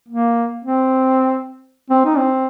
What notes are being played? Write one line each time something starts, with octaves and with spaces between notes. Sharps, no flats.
A#3
C4
C4
D#4
C4